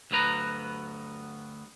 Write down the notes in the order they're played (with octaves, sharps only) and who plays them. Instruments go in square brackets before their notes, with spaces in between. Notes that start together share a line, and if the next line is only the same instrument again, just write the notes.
[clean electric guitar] D2 G2 F#3 B3 B4 A#5